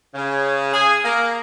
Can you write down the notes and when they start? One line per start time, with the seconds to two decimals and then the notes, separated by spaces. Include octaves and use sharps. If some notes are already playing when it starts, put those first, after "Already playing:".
0.15 C#3
0.74 G#4
1.05 A#3